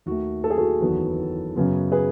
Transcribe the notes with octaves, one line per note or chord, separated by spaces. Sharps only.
D#2 D#3 A3 F#4
A4
G#4
F#4 A4
F#1 E2 D#3 F#3 B3
F#2 C#3 F#3 B3
G#4 B4